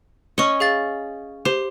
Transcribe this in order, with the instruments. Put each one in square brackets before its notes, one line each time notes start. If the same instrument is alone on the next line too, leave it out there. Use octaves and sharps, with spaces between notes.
[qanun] C#4 D#5 [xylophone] C#6 C#7
[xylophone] G#4 F5 A6
[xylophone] G4 [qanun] C5